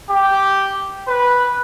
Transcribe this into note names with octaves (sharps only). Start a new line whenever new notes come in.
G4
B4